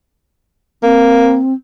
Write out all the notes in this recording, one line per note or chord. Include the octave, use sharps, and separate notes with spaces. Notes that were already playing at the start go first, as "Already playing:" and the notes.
A#3 C4